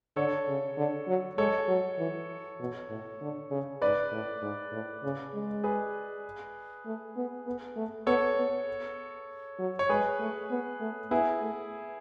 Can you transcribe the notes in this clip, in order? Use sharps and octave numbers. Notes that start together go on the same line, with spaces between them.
D3 A4 C#5
C#3
D3
F#3
G#3 A4 C#5
F#3
E3
B2
A2
D3
C#3
G#2 B4 D5
A2
G#2
A2
C#3
G#3
G#4 B4
A3
B3
B3
A3
B3 A4 C#5
B3
F#3
C#5
G#3 G#4 B4
A3
B3
A3
B3 E4 G#4
A3